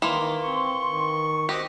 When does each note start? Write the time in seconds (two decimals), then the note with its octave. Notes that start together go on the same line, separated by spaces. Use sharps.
0.02 D#3 E3 A#3 C6
0.43 C4 C#6
0.86 D#3
1.49 C4 F#4 G4 D#5